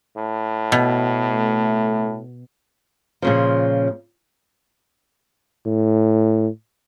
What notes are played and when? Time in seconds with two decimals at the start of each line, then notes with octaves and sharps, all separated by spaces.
0.17 A2
0.72 B2
1.30 A3
3.22 A#2 C#3 F3
5.66 A2